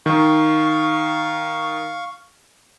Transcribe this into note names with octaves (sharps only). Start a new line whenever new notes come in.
D#3 F5 C#6